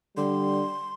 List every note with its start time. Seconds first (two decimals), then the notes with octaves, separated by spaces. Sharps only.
0.17 D3 G3 C6